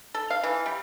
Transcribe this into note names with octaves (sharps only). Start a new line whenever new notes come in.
A4
F5
E3
G3